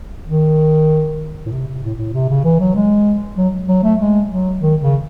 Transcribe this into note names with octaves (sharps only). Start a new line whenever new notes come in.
D#3
A2
C3
C3
A2
A2
C3
C#3
E3
F#3
G#3
F#3
F#3
A3
G#3
F#3
D#3
C#3